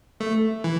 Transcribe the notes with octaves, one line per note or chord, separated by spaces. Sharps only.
A3
E3